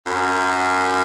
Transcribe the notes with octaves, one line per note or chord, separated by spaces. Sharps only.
F#2